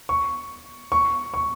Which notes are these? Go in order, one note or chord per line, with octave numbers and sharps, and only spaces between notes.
C#6
C#6
C#6